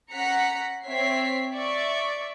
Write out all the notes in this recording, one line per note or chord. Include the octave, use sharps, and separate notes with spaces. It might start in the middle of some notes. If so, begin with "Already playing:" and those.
C#4 F#5 A#5 B6 C#7
C4 C#5 E5 B6 C7
D5 E5 C#6